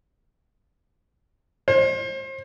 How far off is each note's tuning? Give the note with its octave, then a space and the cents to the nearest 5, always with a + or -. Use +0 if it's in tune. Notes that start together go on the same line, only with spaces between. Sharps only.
C5 +35